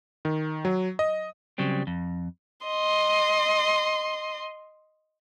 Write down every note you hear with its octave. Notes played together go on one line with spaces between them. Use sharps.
D#3
F#3
D#5
C#3 F#3 G3 C4
F2
D#5 C6